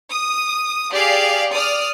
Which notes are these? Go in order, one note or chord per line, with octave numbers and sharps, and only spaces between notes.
D#6
G4 G#4 D5 F5
D5 D#6 F6